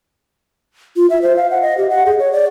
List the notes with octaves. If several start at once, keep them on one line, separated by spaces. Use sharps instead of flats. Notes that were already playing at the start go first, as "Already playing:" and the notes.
F4
E5
C5
F5
F#5
D#5
G4
F#5
G#4
C#5
D5